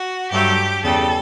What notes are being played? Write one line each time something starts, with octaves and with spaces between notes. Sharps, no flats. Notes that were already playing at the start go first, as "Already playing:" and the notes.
Already playing: F#4
G2 F#3 A3 G4
E2 C#3 G3 A4